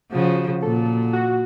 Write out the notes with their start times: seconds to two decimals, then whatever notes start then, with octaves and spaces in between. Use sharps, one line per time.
0.12 C#3 F3 F#4
0.62 A#2 A4
1.13 F#4